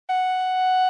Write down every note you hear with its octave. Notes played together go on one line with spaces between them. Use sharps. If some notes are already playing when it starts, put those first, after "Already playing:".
F#5